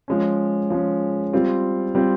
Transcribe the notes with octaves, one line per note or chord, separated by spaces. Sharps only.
F3 G#3 C#4
F3 G#3 C#4
G3 C4 F4
G3 C4 F4